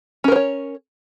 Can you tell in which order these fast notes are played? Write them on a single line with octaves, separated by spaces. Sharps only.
C#4 A#4 C5 C#5